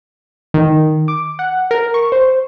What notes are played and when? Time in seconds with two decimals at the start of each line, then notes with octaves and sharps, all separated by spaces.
0.54 D#3
1.08 D6
1.39 F#5
1.71 A#4
1.94 C#6
2.12 C5